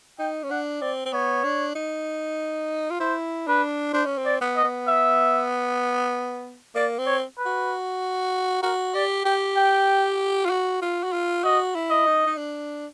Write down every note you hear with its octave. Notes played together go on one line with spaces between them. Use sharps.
D#4 G5
C#4
D4 F#5
C4 D5
C4
B3 C#5
D4
D#4
F4
E4 C5
D4 B4
D4 C5
C#4
C4
D5
B3
D#5
B3
E5
A#3 D5
C4
C#5
B4
F#4
F#4 A#4
G4 D5
G4 G5
G5
F4
F#4
F4
F#4
F4
F#4 D#5
E4
D#5
D#4
D#4
D4